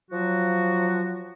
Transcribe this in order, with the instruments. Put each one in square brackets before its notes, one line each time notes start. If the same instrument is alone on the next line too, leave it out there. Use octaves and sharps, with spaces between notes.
[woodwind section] F3 F#3 F#4